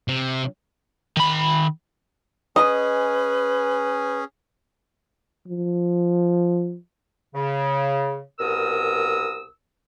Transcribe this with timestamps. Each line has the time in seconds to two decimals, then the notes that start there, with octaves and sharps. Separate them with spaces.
0.08 C3
1.17 D#3 B5
2.56 C#4 G#4 B4 D#5
5.48 F3
7.34 C#3
8.39 C2 B2 A#4 D#6 E6